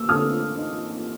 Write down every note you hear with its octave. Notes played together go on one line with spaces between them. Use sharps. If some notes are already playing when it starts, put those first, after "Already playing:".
Already playing: A#3 E6
D3 D#6 F6
D#4